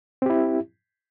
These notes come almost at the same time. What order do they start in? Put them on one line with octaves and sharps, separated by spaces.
C4 G4 E4